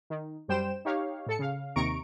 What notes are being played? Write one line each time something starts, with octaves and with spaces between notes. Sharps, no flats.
D#3
F#2 G3 C5 G5 E7
D#4 G4 C#5 F5
A2 A4 C#7
C#3 F5
D#2 C3 D#3 A#5 C#6 D7